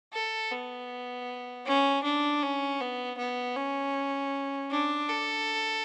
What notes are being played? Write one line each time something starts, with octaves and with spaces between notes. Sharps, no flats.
A4
B3
C#4
D4
C#4
B3
B3
C#4
D4
A4